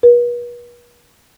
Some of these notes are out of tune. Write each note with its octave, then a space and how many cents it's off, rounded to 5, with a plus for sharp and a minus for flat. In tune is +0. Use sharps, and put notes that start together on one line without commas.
B4 -40